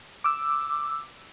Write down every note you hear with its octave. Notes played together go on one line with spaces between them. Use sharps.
D6 E6